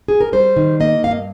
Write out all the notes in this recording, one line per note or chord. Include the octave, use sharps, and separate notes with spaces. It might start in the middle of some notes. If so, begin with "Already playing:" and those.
G#4
A#4
G3 C5
D#3
A#3 D#5
G2 F5
D#5